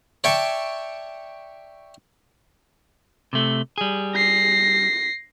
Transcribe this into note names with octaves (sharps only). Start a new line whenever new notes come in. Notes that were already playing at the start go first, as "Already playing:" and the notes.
C#5 D5 E5 G5 A5 C#6
C3 A3
G3 G#4
A#6 C7